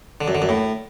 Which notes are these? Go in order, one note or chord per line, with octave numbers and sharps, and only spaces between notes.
D3
F#2
D3
F#2
A2